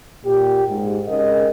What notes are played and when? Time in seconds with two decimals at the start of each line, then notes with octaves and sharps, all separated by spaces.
0.24 A#2 G4
0.69 G#2
1.09 G#2 C#3 A#4 D#5